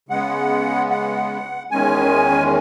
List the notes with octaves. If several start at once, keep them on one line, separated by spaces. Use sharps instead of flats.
C#3 G#3 B3 F#5
F#5
E2 D#3 G#3 C#4 G#5